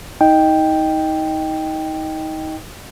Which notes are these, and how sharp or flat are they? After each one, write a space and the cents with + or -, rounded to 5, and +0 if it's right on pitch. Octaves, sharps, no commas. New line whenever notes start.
D#4 +25 D#5 +0 G5 +0